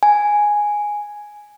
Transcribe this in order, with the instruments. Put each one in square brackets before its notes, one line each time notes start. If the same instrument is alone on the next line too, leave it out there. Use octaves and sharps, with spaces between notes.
[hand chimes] G#5